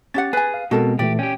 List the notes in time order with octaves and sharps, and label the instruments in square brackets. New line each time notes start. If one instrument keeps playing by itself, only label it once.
[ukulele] C#4 G4 F#5 [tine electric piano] A6
[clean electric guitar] G#4 [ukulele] B4 G#5
[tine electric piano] F5
[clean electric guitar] B2 [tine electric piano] G#3 C4 [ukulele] F#4 A4 A#4
[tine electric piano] A#2 E3 A3 [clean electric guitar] G4 [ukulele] D5
[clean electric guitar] C#4 G4 [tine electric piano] G5